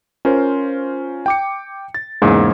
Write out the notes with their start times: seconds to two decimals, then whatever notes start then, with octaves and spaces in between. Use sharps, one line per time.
0.25 C#4 F4 A#4 C5
1.26 G5 D6 C#7
1.94 A6
2.22 E2 G#2 C#3 A#3